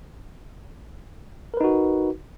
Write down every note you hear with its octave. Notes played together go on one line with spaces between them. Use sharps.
D#4 F#4 A#4 B4